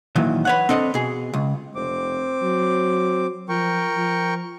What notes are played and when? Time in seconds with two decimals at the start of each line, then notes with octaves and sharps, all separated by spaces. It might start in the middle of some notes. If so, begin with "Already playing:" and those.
0.15 A#2 D#3 E3 F#3
0.45 B4 C#5 F#5
0.69 C4 D4 A4 D#5
0.94 B2 G#4
1.33 C#2
1.75 F1 C4 D6
2.42 F#3
3.49 F3 A#4 G5 C#6
3.97 F3